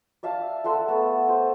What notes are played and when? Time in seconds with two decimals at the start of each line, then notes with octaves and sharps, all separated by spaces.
0.23 D5 E5 F5 A5
0.64 A4 F#5 C6
0.88 A3 B3
1.29 C5